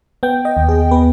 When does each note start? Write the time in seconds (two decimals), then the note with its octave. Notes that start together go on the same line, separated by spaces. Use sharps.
0.23 B3 G5
0.45 D#5
0.57 D#2
0.69 G#4
0.91 B3 B4